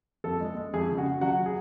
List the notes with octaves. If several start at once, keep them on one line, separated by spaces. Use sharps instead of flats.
F2 A4
G#3
G#3
F2 G#4
C#3
F#4
C#3
F#3 F#4
G#4